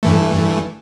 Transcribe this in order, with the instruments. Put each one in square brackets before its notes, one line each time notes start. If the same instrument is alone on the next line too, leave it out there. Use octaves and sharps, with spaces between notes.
[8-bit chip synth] G2 E3 A3